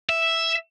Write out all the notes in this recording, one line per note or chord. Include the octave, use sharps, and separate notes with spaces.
E5